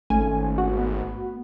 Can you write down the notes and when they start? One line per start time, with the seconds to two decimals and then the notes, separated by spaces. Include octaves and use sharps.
0.10 G#1 A3 C#4 G#5
0.58 F#4
0.77 B3